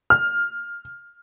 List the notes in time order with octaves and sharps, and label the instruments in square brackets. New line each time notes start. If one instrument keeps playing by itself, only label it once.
[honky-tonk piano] F6